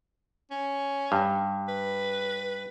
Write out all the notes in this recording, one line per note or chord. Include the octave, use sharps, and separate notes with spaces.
C#4
G2
B4